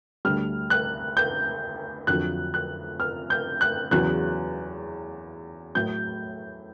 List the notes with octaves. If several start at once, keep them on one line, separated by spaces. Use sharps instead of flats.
D2 D3 G3 F6
F#6
G6
F2 D3 F#3 F#6
F#6
F6
G6
F#6
E2 C#3 F#3 F#6
A2 F#3 G6